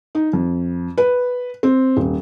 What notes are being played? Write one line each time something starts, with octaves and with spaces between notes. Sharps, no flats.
D#4
F2
B4
C4
D#1